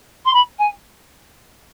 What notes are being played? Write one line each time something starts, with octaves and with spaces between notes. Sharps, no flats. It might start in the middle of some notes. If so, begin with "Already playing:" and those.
C6
B5
G#5